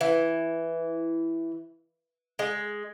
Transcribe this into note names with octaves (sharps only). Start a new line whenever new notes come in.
E3
G#3